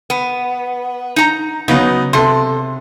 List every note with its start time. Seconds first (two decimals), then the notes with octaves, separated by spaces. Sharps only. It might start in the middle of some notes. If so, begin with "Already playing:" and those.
0.10 B3
1.16 D#4 A#5
1.68 C#3 F#3 B3 D#4
2.13 C3 A4 C6